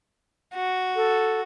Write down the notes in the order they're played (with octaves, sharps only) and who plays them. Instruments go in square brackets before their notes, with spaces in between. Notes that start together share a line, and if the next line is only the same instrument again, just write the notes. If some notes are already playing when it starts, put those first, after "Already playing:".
[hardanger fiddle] F#4
[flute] A4